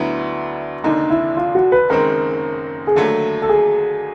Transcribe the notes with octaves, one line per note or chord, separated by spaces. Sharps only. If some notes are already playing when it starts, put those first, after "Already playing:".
Already playing: D2 D3 F#3 B3 E4
F1 D#2 D3 D#4
E4
F4
F#4
B4
F#1 F#2 D#3 G#3 C4 A#4
G#4
D#2 D3 F#3 A3 A4
A4
G#4